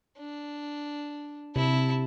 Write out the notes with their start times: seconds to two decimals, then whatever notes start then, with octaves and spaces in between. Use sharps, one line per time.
0.18 D4
1.56 C3 E4 A5